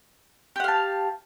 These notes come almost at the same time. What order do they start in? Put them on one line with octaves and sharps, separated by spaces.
G4 F#5 F5 A5